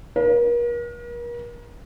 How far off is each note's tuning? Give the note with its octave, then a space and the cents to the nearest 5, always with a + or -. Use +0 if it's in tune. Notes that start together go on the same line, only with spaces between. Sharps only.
A#4 +40